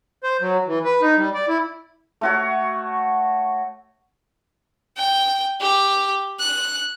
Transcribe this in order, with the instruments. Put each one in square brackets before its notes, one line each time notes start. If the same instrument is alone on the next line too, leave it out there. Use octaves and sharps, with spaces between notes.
[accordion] C5
F#3
E3
B4
D#4
G3
D5
E4
[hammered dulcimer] A3 F#4 C#5
[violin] G5
G4
F#6